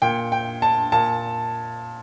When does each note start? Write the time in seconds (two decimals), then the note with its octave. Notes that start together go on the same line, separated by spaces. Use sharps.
0.02 A#2 G5
0.32 G5
0.62 A5
0.92 A#2 A5